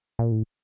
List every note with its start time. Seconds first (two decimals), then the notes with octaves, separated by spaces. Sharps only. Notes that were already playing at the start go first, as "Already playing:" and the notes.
0.19 A#2
0.32 A2